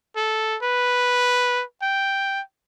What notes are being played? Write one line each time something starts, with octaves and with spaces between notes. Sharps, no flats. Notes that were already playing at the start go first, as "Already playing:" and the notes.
A4
B4
G5